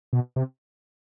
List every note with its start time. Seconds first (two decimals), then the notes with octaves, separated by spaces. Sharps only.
0.13 B2
0.36 C3